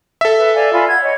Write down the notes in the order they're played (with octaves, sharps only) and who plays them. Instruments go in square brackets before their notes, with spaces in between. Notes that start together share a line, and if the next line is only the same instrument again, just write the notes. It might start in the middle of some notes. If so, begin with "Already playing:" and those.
[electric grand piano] A4 E5
[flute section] B4
D5 F5 G#5
F4 G#5 B5
F#5 G#6
C#5 D#5